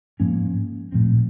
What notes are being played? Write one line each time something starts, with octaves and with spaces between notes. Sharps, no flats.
G#2 F3 A#3 C#4
A#2 F3 A3 C4